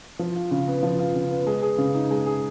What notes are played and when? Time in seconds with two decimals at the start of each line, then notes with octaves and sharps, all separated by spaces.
0.19 F3
0.36 F4
0.51 C#3
0.67 B3
0.83 F3
0.99 F4
1.15 C#3
1.31 B3
1.47 G#3
1.62 G#4
1.78 C#3
1.94 D#4
2.11 G#3
2.26 G#4